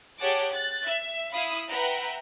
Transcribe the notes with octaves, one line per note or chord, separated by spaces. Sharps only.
G4 G#4 C#5 F#5 A5 D6
F#6 A6
E5
E4 F5 B5 D#6
B4 E5 F#5 G5 A#5